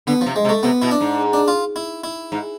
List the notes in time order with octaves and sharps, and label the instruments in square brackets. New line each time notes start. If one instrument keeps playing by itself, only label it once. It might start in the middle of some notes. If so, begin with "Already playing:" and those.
[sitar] D3 [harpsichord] B3
[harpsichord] F3
[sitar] C3
[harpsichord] G#3
[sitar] C3
[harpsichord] A3
[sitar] C3 [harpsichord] B3
[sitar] B2 [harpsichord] E4
[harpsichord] D4
[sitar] G#2
[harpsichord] D4
F4
E4
E4
[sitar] G#2